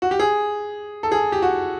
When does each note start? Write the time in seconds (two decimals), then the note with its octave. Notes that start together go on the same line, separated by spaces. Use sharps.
0.02 F#4
0.11 G4
0.19 G#4
1.03 A4
1.12 G#4
1.32 G4
1.42 F#4